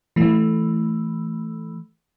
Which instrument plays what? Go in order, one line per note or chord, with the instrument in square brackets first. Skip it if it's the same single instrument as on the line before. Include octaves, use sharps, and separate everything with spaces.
[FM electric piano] E3 A3